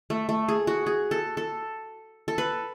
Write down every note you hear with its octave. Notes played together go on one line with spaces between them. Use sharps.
A3
A3
G#4
F#4
G#4
A4
A4
A4
B4